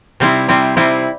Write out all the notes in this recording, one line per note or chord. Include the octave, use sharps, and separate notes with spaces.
C3 G3 C4 E4
C3 G3 C4 E4
C3 G3 C4 E4